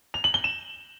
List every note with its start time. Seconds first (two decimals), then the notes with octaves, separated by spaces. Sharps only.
0.14 F7
0.24 F#7
0.34 G7
0.44 E7